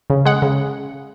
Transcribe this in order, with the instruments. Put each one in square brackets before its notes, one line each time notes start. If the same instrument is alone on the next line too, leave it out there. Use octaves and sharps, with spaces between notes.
[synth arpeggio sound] C#3
G#3 F#5
C#3